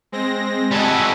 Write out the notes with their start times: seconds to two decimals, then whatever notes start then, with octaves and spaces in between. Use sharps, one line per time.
0.12 G#3 C4 A#6
0.71 G3 A4 D#5 F#5 G#5